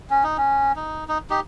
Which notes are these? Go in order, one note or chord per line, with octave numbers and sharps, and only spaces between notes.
C#4
D#4
C#4
D#4
D#4
D#4 G4